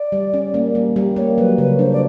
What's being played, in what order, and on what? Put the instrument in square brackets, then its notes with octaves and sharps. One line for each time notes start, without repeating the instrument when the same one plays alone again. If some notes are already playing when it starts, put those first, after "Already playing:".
Already playing: [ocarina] D5
[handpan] G3
C#4
A#3
G3
G3
[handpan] A#3 [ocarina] C#5
[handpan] F#3 [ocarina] B4
[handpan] C#3 [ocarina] B4
[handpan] D4 [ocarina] C5
[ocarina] D5